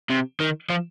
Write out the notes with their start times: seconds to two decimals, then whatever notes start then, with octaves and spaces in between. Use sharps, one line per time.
0.10 C3
0.40 D#3
0.69 F3